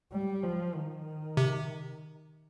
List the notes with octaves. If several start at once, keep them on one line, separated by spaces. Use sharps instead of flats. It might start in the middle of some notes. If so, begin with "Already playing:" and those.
G3
F3
D#3
C3